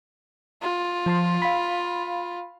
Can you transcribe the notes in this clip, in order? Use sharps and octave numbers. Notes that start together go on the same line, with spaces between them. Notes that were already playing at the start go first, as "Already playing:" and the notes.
F4
F3 A5 C6
F5 B5